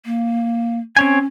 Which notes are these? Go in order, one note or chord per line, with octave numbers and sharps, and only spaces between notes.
A#3
C4 C#4 C#5 G#5